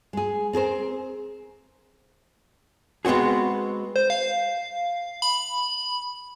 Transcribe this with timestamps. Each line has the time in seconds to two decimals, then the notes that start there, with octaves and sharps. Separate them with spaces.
0.13 G#3 G#4
0.53 C4 G#4 A#4 C5
3.05 G#3 B3 C4 F#4 G#4
3.96 C5
4.10 F5
5.22 B5